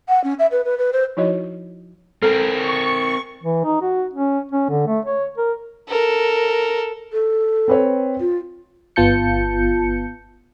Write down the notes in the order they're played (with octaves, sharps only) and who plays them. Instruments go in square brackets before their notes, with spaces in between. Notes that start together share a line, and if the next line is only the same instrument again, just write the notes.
[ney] F#5
C#4
E5
B4
B4
B4
C5
[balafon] F3 D#4 E4 F#4 C#5 D#5
[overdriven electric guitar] C4 A#4 [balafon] A4
[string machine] C#6
[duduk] E3
D#4
F#4
C#4
C#4
D3
A3
C#5
A#4
[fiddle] A4 A#4
[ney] A4
[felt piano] C4 B4 C#5
[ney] F4
[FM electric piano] G1 B3 F4 A5 G6 C#7